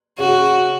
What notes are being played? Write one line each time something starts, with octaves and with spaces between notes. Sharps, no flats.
C#3 C#4 F#4